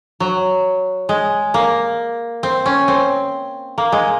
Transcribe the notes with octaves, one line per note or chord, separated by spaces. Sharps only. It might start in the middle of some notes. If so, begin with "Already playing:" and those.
F#3
G#3
A#3
C4
C#4
C4
A#3
G#3